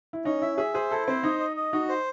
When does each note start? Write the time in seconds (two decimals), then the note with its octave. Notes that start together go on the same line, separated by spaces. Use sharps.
0.13 E4
0.25 C#4 D#4
0.42 E4 E5
0.58 G#4 E5
0.74 G#4 C5
0.90 E4 A4
1.07 C4 C5
1.23 D#4 D#5
1.39 D#5
1.56 D#5
1.73 D#4 F#4
1.89 C5